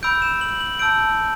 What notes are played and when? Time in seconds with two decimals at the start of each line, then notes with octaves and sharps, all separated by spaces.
0.03 B5 E6 G6 D7
0.22 E7
0.41 F#7
0.61 F#7
0.79 A5 E6 G6 D7